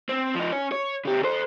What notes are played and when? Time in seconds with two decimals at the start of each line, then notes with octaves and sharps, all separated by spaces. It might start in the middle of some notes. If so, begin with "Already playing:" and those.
0.09 C4
0.35 F3 D#4
0.52 C#4 C#5
0.72 C#5
1.05 C#3 G4
1.23 A4 C5